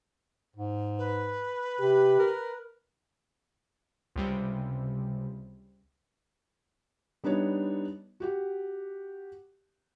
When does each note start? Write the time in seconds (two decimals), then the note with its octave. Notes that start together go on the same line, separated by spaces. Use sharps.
0.56 G#2
0.98 B4
1.80 C3 G4
2.19 A#4
4.16 C#2 C3 G3
7.24 G3 B3 D4 D#4 C#5
8.20 F#4 G4 F#5